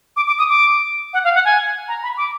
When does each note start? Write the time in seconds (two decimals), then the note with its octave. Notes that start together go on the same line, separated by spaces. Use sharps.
0.17 D6
0.27 D6
0.39 D#6
0.49 D6
1.14 F#5
1.24 F5
1.35 F#5
1.45 G#5
1.88 A#5
2.03 B5
2.17 D6